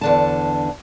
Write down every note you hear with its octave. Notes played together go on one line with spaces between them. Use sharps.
E2 D3 A5